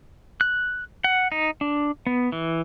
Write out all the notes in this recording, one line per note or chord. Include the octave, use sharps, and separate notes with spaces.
F#6
F#5
D#4
D4
B3
E3